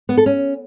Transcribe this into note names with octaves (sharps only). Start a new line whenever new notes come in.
B3
A4
C#4